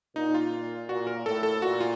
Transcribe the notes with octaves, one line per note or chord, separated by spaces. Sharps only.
A#2 D#4
F4
A#2 F#4
A#4
A2 A4
A4
A#2 F#4
F4